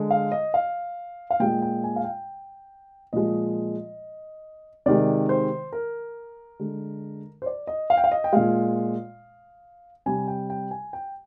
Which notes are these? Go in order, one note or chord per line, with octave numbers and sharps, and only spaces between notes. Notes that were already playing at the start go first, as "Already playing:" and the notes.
Already playing: D3 G#3
F5
D#5
F5
F5
A#2 G#3 G5
G5
G#5
F5
G5
A#2 F3 G#3 D#5
C3 D#3 G#3 D5
C5
A#4
D3 G#3
C5
D5
D#5
F5
G5
F5
D#5
G5
A#2 G#3 F5
C3 G3 G#5
G5
G5
G#5
G5